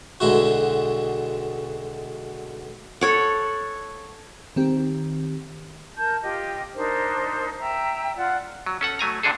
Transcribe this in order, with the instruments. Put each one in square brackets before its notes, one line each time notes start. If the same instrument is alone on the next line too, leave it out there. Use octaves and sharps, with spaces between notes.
[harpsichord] B1 D3 G#3 E4 F#4
[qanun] A4 C#5 F#5
[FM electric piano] D#3 C4 G4
[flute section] A#4 A5 G6
F4 G4 D#5 G5
D4 D#4 A#4 C5
E5 G5 A#5
F4 D5 F#5
[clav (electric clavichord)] F#3
C#4 A4 F#5
F#3 A3 G#5 A#5
A#2 D3 D4 G#4 A4